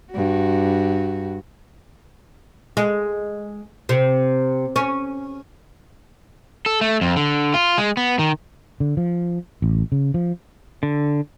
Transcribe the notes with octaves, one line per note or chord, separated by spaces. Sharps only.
G2 F#4
G#3
C3
C#4
A4
A3
F2
D3
F4
G#3
B3
D#3
D3
F3
A1
C#3
F3
D3